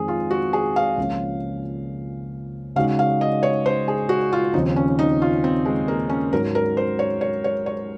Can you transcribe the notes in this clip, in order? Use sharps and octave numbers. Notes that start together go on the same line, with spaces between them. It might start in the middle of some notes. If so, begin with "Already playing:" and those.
Already playing: F2 D#3 G#3 C4 G#4
F4
F#4
G#4
F5
C#2 C#3 F3 A#3 C#4
C#3 G#3 D#4 F#4 F5
F5
D#5
C#5
C5
G#4
F#4
F4
D#2 C#3 F3 C4 D#4
C#4
D#4
F4
C4
G#3
A#3
C#4
G#2 F#3 C#4 A#4
A#4
C5
C#5
C#5
C#5
C#5